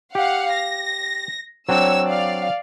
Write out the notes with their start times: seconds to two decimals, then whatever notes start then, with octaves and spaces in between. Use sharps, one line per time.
0.15 G4 F5 F#5
0.52 A#6
1.69 F#3 C4 D4 C#5 E6
2.06 D5 F5